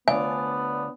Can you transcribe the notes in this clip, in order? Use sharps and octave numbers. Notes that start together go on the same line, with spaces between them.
D2 B3 D4 F4 C#5 D5 G#5